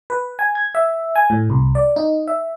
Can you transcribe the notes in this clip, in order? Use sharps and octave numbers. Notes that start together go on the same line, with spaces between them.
B4
G#5
G#6
E5
G#5
A2
C2
D5
D#4
E5